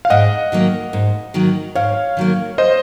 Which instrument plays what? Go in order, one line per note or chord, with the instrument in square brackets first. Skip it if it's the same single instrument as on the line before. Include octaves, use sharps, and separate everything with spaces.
[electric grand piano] F5
[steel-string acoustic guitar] G#2 [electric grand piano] D#5 F#5
[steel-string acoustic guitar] D#3 F#3 A#3
G#2
D#3 F#3 A#3
[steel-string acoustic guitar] G#2 [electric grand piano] C#5 F5
[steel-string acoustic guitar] D#3 F#3 A#3
[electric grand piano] C5 D#5